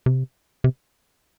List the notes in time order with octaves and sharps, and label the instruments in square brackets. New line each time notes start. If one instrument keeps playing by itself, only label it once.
[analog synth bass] C3
C3